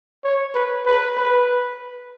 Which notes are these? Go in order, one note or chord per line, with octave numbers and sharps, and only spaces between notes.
C#5
B4
B4
B4